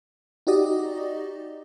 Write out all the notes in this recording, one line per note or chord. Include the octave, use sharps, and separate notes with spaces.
D#4 F#4 G4 D5 D#5